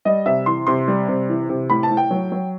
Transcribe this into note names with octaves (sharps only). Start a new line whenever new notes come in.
G3 D#5
C3 E5
E3 C6
C3 C6
G3
C3
E3
C3
A2 B5
A5
A2
G5
F#3
F#3